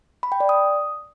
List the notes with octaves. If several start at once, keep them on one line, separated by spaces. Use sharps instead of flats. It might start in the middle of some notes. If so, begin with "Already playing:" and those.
B5
G5
D5
D#6